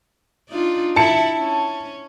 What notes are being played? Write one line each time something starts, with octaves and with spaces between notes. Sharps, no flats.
D4 D#4 F4
E4 A5 C#7
C#4